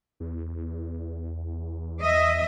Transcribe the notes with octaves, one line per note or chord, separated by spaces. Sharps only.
E2
D#5 E5